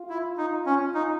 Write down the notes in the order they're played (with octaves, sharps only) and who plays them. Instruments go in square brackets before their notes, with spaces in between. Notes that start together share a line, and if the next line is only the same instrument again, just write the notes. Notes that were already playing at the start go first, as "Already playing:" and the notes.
Already playing: [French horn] F4
[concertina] E4
D#4
C#4
D#4